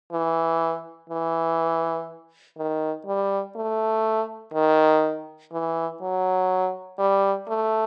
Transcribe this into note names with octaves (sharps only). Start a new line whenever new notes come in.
E3
E3
D#3
G3
A3
D#3
E3
F#3
G3
A3